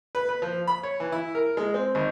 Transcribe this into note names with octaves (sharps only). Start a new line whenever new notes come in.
B4
B4
F3
B5
C#5
E3
E4
A#4
G#3
C4
G#1